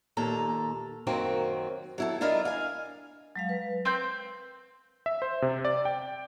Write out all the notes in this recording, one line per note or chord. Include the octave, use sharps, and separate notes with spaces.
D#2 A#2 A4 A#5
F#2 D#3 F#3 A#3 C4
F#3 E4 A4
D4 E4 F4 A#4 D5 D#5
F5 G#5
F#3 G#3 F5
B4
C4 G6
E5
C5
C3
D5
G5